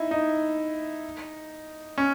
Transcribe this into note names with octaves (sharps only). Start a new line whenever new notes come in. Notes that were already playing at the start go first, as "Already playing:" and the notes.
Already playing: D#4 E4
D#4
C#4